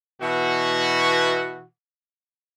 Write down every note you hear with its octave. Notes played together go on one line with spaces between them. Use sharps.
B2 E3 F#4